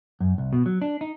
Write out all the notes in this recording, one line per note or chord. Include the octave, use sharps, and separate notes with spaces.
F#2
C2
B2
F#3
D4
D#4